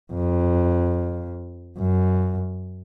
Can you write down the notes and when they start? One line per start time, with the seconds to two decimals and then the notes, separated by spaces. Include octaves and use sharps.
0.13 F2
1.78 F#2